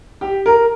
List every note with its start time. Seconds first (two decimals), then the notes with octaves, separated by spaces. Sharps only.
0.21 G4
0.46 A#4